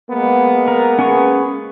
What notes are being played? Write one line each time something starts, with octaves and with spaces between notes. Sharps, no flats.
G#3 A#3 B3
A#4
C#4 G#4 C#6